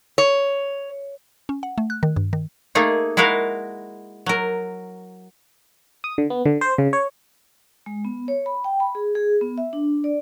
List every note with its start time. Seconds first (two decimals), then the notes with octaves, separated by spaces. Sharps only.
0.18 C#5
1.49 C#4
1.63 F#5
1.78 A3
1.90 F#6
2.03 D#3
2.16 G2
2.33 D#3
2.75 A3 A#3 D#4 G#4
3.17 G#3 E4 F#4 A#4 F5
4.26 F#3 A#4
6.04 D#6
6.18 D3
6.30 B3
6.46 D3
6.61 C5
6.78 C#3
6.93 C#5
7.86 G#3
8.05 B3
8.28 C#5
8.46 B5
8.64 G5
8.80 B5
8.95 G#4
9.15 G#4
9.41 B3
9.58 E5
9.73 D4
10.04 D5